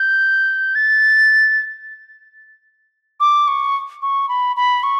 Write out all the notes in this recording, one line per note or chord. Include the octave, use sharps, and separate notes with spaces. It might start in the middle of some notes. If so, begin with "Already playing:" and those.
Already playing: G6
A6
D6
C#6
C#6
B5
B5
C#6